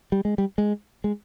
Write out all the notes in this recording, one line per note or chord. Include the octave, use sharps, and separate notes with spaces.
G3
G#3
G3
G#3
G#3